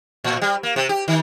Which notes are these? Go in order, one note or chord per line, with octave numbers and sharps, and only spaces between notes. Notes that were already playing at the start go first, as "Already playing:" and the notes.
A2
G3
A#3
C3
G4
D#3